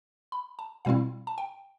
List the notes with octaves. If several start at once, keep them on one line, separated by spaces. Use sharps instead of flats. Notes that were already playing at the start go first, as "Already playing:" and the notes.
B5
A5
B2 G3 C4 E4 F5
A5
G5